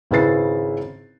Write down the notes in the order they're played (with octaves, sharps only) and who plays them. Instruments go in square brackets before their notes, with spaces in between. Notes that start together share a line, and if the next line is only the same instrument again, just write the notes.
[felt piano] G#1 C#3 E4 B4 A6 C7